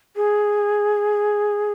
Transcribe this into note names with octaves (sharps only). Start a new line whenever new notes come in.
G#4